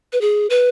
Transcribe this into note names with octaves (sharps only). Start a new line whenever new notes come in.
B4
G#4
B4